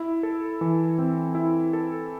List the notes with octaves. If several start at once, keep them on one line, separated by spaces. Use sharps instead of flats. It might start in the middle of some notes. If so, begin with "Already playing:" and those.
Already playing: E4
A4
E3
C4
E4
A4